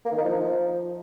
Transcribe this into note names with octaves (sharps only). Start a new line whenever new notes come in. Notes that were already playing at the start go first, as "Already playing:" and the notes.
A#3
D#3
D#4
F3